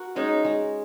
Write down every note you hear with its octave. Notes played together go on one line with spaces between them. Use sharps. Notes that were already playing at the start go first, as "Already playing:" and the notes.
Already playing: F#4 A#4
G#3 C#4 D#4
G#3